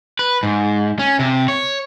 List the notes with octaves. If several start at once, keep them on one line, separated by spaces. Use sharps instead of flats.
B4
G#2
C#4
C3
C#5